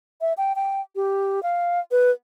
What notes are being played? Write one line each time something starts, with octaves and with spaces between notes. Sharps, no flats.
E5
G5
G5
G4
F5
B4